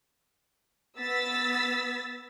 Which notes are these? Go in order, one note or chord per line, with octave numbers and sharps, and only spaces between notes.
B3 E6 A6 B6